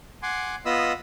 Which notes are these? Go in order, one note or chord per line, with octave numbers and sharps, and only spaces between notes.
F#5 G#5 C6 D6
B3 F4 D#5 B5 D#6 E6